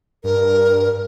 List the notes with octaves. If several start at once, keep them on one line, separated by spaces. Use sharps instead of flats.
G2 A#4